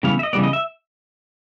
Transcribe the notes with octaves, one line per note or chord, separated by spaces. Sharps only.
C#3 E3 G3 B3 F5
E5
D#5
C#3 E3 G3 B3 D5
D#5
E5